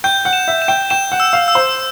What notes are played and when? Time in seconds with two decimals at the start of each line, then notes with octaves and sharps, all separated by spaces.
0.04 G5 G6
0.25 F#5
0.33 E7
0.48 E5
0.62 E7
0.68 G5
0.90 G5 E7
1.12 F#5
1.20 E6
1.33 F5
1.48 E6
1.55 C5